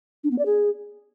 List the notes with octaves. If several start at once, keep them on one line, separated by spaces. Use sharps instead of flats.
D4
B3
D5
G#4